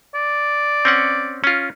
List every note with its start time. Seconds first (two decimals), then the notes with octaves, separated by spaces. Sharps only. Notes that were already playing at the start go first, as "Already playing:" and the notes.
0.15 D5
0.85 C4 C#4 F#5
1.44 C#4 F4